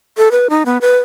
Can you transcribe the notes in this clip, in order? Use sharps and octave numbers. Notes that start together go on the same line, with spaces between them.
A4
B4
D#4
B3
B4